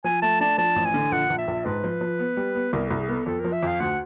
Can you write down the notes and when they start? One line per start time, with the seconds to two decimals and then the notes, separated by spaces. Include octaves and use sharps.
0.04 F3 G#5
0.22 A3 A5
0.40 D4 A5
0.58 F3 A5
0.76 A1
0.85 G#5
0.94 D3
1.12 A#1 F#5
1.30 A#1
1.38 E5
1.48 A#1
1.65 G#2 B4
1.84 F3
2.01 F3
2.19 B3
2.37 G3
2.55 B3
2.73 C2 A#4
2.87 C2 A4
2.99 G#4
3.08 B3 A#4
3.12 A4
3.26 F2 A4
3.40 F3 A#4
3.53 E5
3.63 F2 F5
3.80 D2 F#5